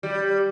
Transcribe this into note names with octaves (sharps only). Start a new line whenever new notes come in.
G3